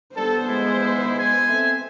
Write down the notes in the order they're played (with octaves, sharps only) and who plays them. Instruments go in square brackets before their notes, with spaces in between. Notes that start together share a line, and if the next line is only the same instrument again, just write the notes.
[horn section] G3 D4 A4 [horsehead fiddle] B3 C5
[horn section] G#3 [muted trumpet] E4
[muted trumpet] G#5
[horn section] C4 A4 E5